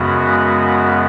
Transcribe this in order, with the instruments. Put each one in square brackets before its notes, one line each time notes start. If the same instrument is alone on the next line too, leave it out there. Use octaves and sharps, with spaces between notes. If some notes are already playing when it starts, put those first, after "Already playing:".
Already playing: [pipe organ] F#2 C#3 G#3 B3 F#4